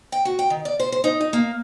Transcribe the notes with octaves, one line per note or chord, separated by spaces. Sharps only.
G5
F#4
G5
D#3
D5
C5
C5
D#4
D#4
A#3